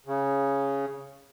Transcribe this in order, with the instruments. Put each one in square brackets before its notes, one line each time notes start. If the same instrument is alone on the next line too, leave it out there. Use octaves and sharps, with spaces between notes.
[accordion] C#3